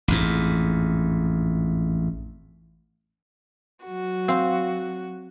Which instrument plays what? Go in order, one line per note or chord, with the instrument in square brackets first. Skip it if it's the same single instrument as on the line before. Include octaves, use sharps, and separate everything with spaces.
[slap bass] A1 F2 G#2
[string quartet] F#3 F#4
[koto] C4 [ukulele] F5